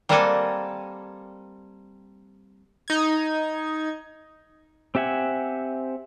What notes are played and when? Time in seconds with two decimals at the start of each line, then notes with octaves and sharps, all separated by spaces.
0.09 G3 A#3 C4 A4 F#5 G#5
2.88 D#4 G#6
4.95 C4 G4 E5 F#5 G#5